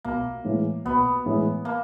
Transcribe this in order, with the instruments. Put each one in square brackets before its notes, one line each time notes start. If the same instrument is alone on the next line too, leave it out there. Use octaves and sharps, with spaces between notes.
[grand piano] B1 [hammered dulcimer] A#3
[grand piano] A2 E3 G#3
[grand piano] B1 [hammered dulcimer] B3
[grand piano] A2 E3 G#3
[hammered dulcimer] A#3